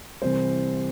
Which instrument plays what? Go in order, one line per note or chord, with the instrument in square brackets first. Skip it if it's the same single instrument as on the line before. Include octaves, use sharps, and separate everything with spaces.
[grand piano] C2 C3 E3 C5